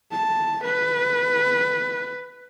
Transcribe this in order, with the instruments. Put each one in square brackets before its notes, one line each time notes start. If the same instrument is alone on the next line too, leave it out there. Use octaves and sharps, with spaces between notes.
[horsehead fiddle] A5
B4